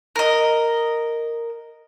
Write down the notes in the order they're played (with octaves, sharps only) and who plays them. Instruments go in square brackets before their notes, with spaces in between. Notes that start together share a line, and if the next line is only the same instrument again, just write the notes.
[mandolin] A#4 D#5